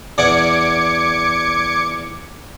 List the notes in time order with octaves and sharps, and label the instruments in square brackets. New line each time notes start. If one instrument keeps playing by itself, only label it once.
[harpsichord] E2 D5 F#5 [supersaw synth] D6 G#6 C#7